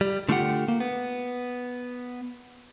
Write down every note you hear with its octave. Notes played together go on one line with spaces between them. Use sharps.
G3
D3 A3 F4 G4 F#5
A#3
B3